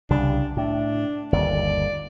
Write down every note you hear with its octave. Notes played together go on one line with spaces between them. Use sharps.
C2 C#3 G3 D4
A2 D4
G1 D#2 D5